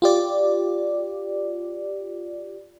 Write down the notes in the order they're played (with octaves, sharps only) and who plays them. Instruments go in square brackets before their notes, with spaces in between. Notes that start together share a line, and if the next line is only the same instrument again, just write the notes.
[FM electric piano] F4 G4 D5